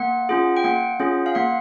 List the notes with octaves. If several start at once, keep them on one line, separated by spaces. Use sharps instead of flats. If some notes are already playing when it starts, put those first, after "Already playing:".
Already playing: A#3 F#5
C#4 F4 G#4
G5
A#3 F#5
C#4 F4 G#4
F5
A#3 F#5